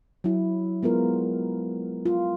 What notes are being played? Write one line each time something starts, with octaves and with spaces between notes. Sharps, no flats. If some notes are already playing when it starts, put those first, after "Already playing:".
F#3 E4
G#3 B3 F4 A#4
F4